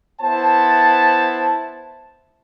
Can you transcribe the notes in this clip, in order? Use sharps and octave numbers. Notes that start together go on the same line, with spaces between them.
B3 E4 C5 A5